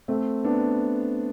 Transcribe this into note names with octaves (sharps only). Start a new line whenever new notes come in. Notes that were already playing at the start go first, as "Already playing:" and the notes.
A3 C4
B3 D4